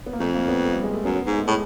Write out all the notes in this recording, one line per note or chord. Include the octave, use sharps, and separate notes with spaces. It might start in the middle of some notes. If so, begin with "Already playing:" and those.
B3
A#3
F2 A3
A#3
B3
A3
G3
G#3
A3
F#2 B3
B3
G#2
G#3
A3
A2 G#3